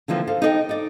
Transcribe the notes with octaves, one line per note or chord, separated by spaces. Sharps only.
D3 E3 F3 A#3 C4
A4 C5 F5
D#4 A4 C5 D5 D#5 G5
D#4 D5